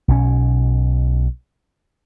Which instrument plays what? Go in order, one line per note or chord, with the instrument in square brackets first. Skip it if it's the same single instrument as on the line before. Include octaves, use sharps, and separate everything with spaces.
[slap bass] B1 B2 C#4